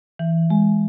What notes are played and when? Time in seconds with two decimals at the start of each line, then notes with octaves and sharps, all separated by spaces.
0.19 E3
0.50 G#3